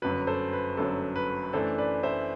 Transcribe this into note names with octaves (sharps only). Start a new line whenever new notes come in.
G1 F#2 F#3 B4
A4 C5
B4
G1 F#2 F#3 A4
B4
F#2 E3 A3 D4 A4 C5
B4 D5
C5 E5